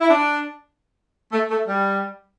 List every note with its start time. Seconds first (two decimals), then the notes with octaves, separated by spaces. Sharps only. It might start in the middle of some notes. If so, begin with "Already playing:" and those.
0.01 E4
0.09 D4
1.32 A3
1.50 A3
1.67 G3